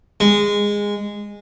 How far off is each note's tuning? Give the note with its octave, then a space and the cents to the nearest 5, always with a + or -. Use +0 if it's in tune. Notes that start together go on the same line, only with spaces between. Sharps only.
G#3 -15